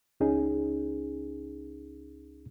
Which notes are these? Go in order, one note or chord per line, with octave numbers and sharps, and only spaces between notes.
C#2 C#4 D#4 G#4